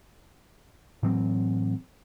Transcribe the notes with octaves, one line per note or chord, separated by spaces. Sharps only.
A2 E3 F#3 C4